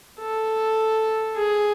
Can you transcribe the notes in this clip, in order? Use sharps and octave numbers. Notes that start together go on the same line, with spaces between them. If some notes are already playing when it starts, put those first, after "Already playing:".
A4
G#4